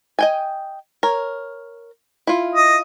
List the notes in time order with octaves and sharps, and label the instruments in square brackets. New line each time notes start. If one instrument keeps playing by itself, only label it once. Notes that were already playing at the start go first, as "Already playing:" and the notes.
[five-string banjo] D#5 G5 G#5
A#4 C#5
E4 F4
[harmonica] D#5